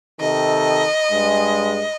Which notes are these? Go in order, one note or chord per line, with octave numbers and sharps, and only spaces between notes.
C3 D#3 A4 D#5
G2 G#3